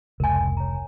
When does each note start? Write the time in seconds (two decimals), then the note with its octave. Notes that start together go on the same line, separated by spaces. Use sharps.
0.20 F1 C#2 A#4 G#5
0.57 C#5 A#5